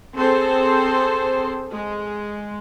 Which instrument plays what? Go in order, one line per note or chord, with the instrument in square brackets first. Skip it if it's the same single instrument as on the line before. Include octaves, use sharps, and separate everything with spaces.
[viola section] C4 G#4 A4 C5
G#3